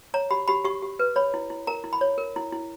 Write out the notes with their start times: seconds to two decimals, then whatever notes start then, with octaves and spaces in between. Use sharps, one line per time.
0.14 C#5 A#5
0.31 G4 B5
0.48 G4 B5
0.64 G4 C#6
0.82 G4
0.99 B4
1.16 C#5 B5
1.34 E4
1.50 E4
1.67 A#4 A#5
1.84 E4
1.93 B5
2.01 C#5
2.18 A#4
2.36 E4
2.52 E4